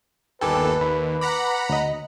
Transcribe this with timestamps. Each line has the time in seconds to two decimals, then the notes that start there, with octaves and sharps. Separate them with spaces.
0.41 G1 D#2 A4 B4 G5 G#5 D6
0.81 D#2 B5
1.21 F#5 A#5 B5 D6
1.69 D2 D#5